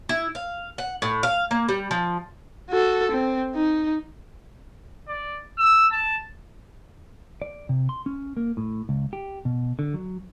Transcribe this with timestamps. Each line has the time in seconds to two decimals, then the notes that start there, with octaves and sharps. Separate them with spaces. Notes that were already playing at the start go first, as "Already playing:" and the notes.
0.09 E4
0.35 F5
0.78 F#5
1.02 A2
1.23 F5
1.51 A#3
1.69 G3
1.91 F3
2.70 F#4 A4
3.11 C4
3.55 D#4
5.08 D5
5.58 E6
5.92 A5
7.42 D5
7.69 C3
7.89 C6
8.06 C#4
8.37 A#3
8.57 A2
8.89 C#2
9.13 G4
9.45 B2
9.79 D3
9.94 F#3